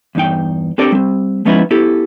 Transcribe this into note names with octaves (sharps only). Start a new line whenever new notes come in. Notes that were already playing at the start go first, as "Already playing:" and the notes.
E2 G2 D#4 G5
C4 D4 G4 A4 A#4 D5
G3 C4
F3 G#3 B3 C#4 D#4 E4
B3 E4 G4 A4